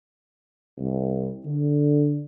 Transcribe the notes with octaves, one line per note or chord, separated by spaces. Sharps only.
C2
D3